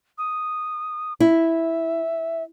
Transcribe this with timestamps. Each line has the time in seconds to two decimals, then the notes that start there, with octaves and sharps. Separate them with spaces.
0.18 D#6
1.20 E4 E5